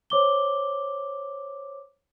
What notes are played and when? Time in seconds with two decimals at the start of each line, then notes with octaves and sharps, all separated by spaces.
0.10 C5 C#5 D6 G7